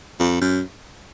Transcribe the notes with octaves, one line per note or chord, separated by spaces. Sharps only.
F2
F#2